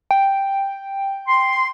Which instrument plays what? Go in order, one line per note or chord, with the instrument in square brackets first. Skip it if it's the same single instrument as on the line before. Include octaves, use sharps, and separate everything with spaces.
[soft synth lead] G5
[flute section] C6